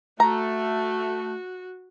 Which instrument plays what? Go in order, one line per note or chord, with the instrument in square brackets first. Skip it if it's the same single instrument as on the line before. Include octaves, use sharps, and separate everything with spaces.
[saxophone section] A3 [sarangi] F#4 [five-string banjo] A#5